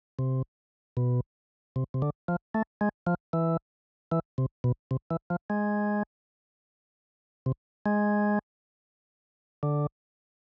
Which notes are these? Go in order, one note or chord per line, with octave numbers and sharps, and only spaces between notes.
C3
B2
C3
C3
D3
F3
A3
G#3
F3
E3
E3
C3
B2
C3
E3
F3
G#3
C3
G#3
D3